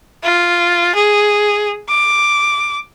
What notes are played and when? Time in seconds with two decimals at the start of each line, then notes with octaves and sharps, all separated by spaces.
0.23 F4
0.95 G#4
1.89 D6